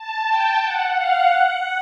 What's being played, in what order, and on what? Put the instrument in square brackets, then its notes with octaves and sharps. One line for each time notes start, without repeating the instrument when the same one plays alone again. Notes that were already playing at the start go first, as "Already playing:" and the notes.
Already playing: [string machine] A5
G5
F#5
F5
F#5